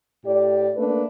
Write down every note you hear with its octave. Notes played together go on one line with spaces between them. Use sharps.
A2 G4 D5
A3 A#3 D4 B4